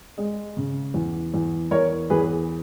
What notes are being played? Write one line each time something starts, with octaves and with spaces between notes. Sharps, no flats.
G#3
C#3
E2
E2
E2 A#4 C#5
E2 G#4 B4